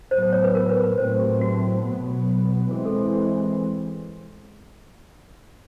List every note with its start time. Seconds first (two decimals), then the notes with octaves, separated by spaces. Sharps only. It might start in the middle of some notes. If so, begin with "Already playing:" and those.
0.11 A2 F#3 B3 C5
0.22 C5
0.33 C#5
0.44 B4
0.55 A#4
0.69 B4
0.84 B4
0.98 A2 F#3 A3 C4 C5
1.20 G4
1.41 F#4
1.85 B2 F#3 B3
2.71 E3 G#3 C4 G#4
2.85 A4